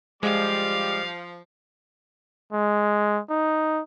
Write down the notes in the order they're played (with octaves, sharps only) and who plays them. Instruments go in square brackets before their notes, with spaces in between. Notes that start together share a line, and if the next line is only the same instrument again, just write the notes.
[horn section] F3 [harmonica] G3 D6 [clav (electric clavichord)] G#3 [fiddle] F5
[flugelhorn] G#3
D#4